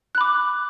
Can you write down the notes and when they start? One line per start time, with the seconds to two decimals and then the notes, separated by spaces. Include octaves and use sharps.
0.15 F#6
0.18 B5
0.21 D6